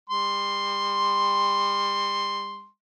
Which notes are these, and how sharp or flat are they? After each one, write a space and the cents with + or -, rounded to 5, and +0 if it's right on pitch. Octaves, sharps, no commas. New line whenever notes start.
G3 +35 C6 +0